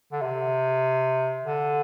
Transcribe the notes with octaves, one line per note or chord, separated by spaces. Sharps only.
D3
C3
D3